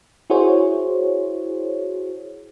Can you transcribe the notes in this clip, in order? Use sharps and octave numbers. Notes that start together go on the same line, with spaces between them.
E4 F#4 G#4 C5 C#5